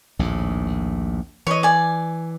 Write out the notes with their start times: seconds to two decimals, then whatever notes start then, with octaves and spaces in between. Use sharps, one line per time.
0.19 A#1 D#2 A2
1.47 E3 C#5 D#5
1.63 D5 G#5